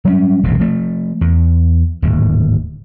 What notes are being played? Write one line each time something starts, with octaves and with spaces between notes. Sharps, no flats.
F#3 G3 C4 C#4
E1 A1 C3
F3 A3
E2
D1 D#2 G#2